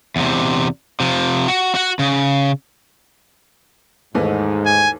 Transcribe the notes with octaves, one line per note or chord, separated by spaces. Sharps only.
E2 C3
C3 F3
F#4
F#4 F#5
C#3
D#2 G#2 E3 A3
G#5